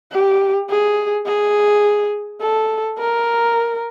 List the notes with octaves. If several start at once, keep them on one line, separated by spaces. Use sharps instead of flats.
G4
G#4
G#4
A4
A#4